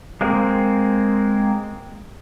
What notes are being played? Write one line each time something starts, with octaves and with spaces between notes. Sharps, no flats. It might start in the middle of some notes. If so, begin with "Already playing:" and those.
G#3 A#3 C4